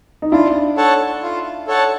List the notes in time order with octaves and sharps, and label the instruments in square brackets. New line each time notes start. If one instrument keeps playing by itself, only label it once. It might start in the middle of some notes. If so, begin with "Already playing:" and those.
[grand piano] D#4
[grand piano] D4 E4 [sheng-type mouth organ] F4
[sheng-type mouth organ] A4 C#5 F#5 A5
F4
A4 C#5 F#5 A5